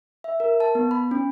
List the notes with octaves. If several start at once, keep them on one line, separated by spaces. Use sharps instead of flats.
E5
A#4
A5
B3
B5
C#4